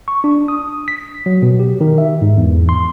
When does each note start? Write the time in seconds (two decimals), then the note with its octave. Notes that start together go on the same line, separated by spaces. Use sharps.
0.08 C#6
0.24 D4
0.48 D#6
0.88 B6
1.26 F#3
1.42 B2
1.59 G4
1.81 D#3
1.98 E5
2.21 G#2
2.37 E2
2.69 C6